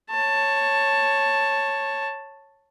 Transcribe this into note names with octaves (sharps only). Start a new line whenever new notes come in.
C#5 A5